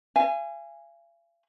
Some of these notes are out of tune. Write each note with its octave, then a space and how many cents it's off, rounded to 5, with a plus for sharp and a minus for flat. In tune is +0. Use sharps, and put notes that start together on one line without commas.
F5 -45 G#5 -10